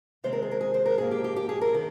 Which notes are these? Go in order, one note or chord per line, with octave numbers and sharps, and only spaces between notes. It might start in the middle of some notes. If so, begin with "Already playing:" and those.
C3 D#3 G#3 C4 C5
A#4
G#4
A#4
G#4
C5
A#4
G#2 F3 A#3 G#4
G4
G4
G4
G#4
A#4
D#3